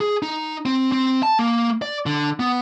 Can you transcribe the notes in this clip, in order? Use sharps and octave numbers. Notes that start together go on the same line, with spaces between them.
G#4
D#4
C4
C4
A5
A#3
D5
D3
B3